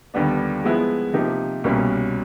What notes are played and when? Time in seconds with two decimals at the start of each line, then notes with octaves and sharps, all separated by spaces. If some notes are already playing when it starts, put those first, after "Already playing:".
0.14 D#2 D3 G3 B3 D4
0.64 F3 G#3 B3 E4
1.13 C3 F3 A#3 D#4 G4
1.64 C2 B2 G3 A#3 C#4